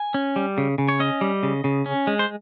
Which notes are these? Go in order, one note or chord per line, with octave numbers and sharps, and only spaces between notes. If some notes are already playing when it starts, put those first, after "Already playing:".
Already playing: G#5
C#4
G3
C#3
C#3
C#5
C#4 D#5
G3
C#3
C#3
C#4
G#3
C5